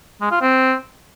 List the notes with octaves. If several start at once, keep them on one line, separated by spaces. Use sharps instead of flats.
G#3
F4
C4